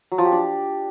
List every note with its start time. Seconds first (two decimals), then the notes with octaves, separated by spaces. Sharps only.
0.12 F#3
0.18 F3
0.25 G4
0.32 D4